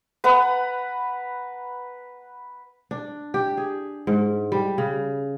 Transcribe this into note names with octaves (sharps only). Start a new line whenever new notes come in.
B4 F#5 A#5
D4
G4
G#4
G#2
G3
C#3